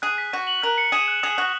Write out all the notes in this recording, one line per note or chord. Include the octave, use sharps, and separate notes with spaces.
G#4 F#6
B6
F#4 D#7
F#7
A#4 F#6
C#7
G#4 E7
F#6
G#4 D#6
F#4 F#6